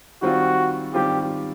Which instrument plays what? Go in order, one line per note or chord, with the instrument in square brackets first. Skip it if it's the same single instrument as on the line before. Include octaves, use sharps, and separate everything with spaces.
[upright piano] D#3 G3 C4 F4 [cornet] F#4
[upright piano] D#3 G3 C4 F4 [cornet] G4